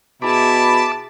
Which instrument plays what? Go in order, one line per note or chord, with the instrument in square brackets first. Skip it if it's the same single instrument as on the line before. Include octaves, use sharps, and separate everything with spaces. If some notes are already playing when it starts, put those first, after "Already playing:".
[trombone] B2 [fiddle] E4 G#4 [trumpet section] A5 [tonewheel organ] B5 D6